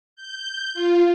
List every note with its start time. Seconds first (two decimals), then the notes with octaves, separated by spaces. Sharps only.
0.16 G6
0.74 F4